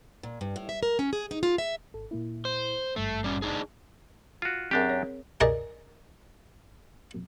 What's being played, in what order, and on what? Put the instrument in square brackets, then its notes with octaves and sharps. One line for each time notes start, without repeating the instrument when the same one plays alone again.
[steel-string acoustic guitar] A#2
G2
A2
E5
A#4
C#4
G#4
D#4
F4
E5
[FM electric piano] G#1 A4
A#2 A#3 E4
[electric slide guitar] C5
[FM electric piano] G#1 G2 C7 [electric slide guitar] A3
[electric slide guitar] G3 C#4
D4 D#4 G#4
[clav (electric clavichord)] F4 F#4
[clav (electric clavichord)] F#2 D4 G4 [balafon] C4 G#4 A#4
[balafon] C#5
[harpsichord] G#4 A#4 D5 D#5